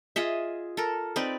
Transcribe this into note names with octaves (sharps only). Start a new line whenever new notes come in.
F4 G#4 D#5 E5
A4 A#4
C4 D#4 B4 D5